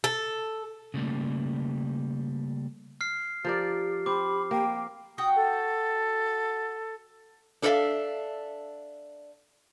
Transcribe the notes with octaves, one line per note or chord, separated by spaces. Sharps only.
A4
C#3 G3 A3 A#3
F6 C7
F3 G4 A#4 D5
C4 B5 D6
A#3 G5
F#4 F#5 G5 D#6
A4
D4 A4 A#4 D5 E5 F5